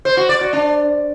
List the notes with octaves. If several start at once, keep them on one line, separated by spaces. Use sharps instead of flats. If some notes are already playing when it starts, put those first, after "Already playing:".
C5
F#4
D5
F#4
D4